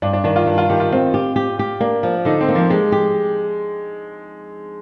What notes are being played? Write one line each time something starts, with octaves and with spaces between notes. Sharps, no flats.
G2 D4
D4
D#3 D4
F4
G2
F4
D#3 G4
F4
C4 F4
F4 G4
G4
G4
A#3 D4
F3
D3 D#4
C4
A#3
F3
G#3 G4
G4